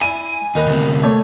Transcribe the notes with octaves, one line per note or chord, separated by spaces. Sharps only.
E4 G#5 D#7
D#2 D#4 A#4 B4
D2 C3
A3 C#5